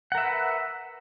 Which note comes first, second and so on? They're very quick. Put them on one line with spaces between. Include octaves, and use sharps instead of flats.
F#5 A#4 E5 B4